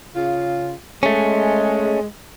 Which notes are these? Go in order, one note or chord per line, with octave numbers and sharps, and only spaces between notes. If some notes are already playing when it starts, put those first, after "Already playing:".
C#3 F4
G#3 A3 C#4